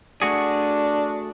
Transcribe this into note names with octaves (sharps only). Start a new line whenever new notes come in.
A3 D4 F#4 G#4